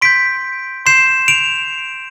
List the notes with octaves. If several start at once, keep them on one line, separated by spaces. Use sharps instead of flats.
C6 G6 B6 D7
C6 G6 C7 E7
D7 F7